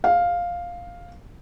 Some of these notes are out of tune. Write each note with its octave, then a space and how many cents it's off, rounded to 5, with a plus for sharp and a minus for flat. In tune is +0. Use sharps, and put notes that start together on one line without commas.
F5 +5